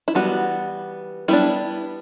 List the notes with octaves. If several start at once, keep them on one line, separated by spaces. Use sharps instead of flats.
E4
E3 G3 B3 F#4
G3 B3 D4 E4